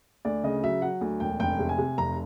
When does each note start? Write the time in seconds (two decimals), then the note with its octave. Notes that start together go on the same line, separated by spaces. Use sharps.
0.25 D2 D5
0.44 C#3 D#5
0.63 F#3 E5
0.82 F#3 F#5
1.01 D2
1.20 E1 G5
1.40 F1 G5
1.59 C3
1.69 G#5
1.78 C3
1.98 F1 A#5